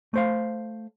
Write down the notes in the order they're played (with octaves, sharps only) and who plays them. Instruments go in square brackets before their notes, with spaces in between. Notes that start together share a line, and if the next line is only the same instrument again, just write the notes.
[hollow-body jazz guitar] A3 C5 F5